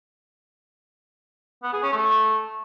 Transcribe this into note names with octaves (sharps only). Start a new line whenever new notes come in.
B3
G#4
C#4
A3